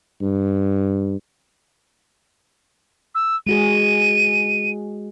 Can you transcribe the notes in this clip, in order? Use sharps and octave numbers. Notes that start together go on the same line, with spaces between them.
G2
E6
G#3 F#4 G#4 D#7